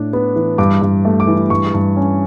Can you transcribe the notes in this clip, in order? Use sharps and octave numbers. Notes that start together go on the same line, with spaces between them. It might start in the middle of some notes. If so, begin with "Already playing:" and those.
Already playing: A2 D4
B3
E3
G2 D6
G2
A3
D6
E3
G2 C#6
G2
C#4